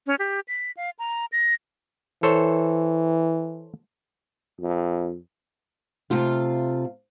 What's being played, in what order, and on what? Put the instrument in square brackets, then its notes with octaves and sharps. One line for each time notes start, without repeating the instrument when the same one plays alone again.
[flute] C#4
G4
B6
F5
A#5
A#6
[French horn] E3 [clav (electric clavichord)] A4 C5 C#5
[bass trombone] F2
[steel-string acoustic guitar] C3 A3 F4 F5